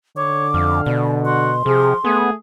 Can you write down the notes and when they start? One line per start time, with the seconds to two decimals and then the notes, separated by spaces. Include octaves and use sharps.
0.17 D3 C#5 D6
0.54 F2 F5
0.86 B2 D5
1.25 F#4 C6
1.66 C3 F3 G#4
2.05 A3 B3 G#4